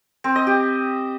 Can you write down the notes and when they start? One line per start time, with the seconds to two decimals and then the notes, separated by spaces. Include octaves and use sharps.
0.24 C4
0.35 D#5
0.47 G4